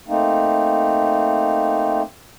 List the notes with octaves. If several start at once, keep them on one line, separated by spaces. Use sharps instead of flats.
A3 A#3 C4 D#4